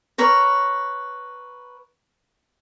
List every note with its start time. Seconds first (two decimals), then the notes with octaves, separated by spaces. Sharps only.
0.18 A#4 B4 C#5